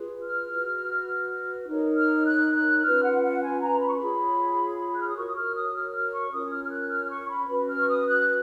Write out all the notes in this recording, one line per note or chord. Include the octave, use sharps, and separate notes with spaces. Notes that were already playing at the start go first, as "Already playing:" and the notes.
Already playing: F4 G#4 B4
F6
F#4 B4
D#4 A#4 C#5
F6
F#6
F#6
C#4 F4 B4 F6
F#5
F#5
G#5
A#5
B5
C#6
B5
F4 G#4 C#5
F#6
F6
D#6
F#4 A#4 C#5 C#6
D#6
F6
D#6
F6
F6
C#6
C#4 F4 A#4 C#5 D#6
F6
F6
F#6
F6
C#6
B5
C#4 F#4 B4 B5
F6
C#6
D#6
F#6